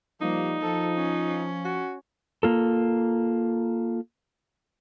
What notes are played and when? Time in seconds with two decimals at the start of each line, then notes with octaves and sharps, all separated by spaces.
0.21 F3 G3 A#3 D#4
0.62 F3 A4
0.96 C#4
1.65 F#4
2.43 A#3 F4 A4